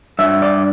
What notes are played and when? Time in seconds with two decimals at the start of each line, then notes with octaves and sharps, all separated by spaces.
0.19 G2 E5
0.42 D5